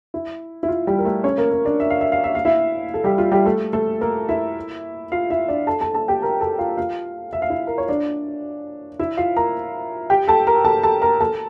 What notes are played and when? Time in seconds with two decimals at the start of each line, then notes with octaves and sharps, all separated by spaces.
0.14 E4
0.63 E4
0.68 F4
0.87 G3 G4
0.98 A#4
1.05 A3 A4
1.24 C#4 C#5
1.38 A#3 A#4
1.51 A#3 A#4
1.65 D4 D5
1.80 E5
1.90 F5
2.01 E5
2.12 F5
2.24 E5
2.35 F5
2.45 E4 E5
2.94 A4
3.04 G3 G4
3.18 F4
3.32 G3 G4
3.45 A3 A4
3.73 A3 A4
4.01 A#3 A#4
4.29 E4 E5
5.12 F4 F5
5.30 E4 E5
5.48 D4 D5
5.67 A4 A5
5.81 A4 A5
5.94 A4 A5
6.08 G4 G5
6.22 A#4 A#5
6.41 A4 A5
6.59 F4 F5
6.77 F4 F5
7.33 E5
7.42 F5
7.50 E4 E5
7.67 A#4
7.78 C#5
7.88 D4 D5
8.99 E4 E5
9.17 F4 F5
9.36 A#4 A#5
10.10 G4 G5
10.28 A4 A5
10.47 A#4 A#5
10.65 A4 A5
10.83 A4 A5
11.02 A#4 A#5
11.20 A4 A5